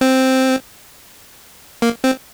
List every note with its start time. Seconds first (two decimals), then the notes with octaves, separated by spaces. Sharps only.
0.01 C4
1.82 A#3
2.04 C4